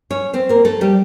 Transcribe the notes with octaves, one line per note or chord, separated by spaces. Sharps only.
C#4 C#5
C4 C5
A#3 A#4
A3 A4
G3 G4